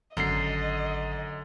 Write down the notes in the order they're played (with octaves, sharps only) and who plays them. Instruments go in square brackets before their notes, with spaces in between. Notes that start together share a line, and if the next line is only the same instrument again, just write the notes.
[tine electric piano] G#1 C7 [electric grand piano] F#2 [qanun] D3 A#5 C6 [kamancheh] D#5